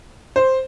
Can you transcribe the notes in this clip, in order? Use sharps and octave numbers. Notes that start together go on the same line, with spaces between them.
C5